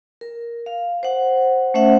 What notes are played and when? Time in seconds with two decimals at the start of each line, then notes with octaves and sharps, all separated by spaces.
0.21 A#4
0.66 F5
1.03 C5 F#5
1.74 A3 C#4 C5 E5 F#5